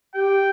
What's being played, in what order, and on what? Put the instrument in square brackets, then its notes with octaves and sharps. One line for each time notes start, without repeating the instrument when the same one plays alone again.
[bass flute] G4 [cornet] G5